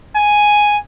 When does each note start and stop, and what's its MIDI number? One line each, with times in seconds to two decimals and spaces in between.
0.16 0.78 80